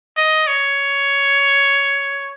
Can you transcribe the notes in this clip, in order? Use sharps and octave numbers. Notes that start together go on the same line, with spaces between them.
D#5
C#5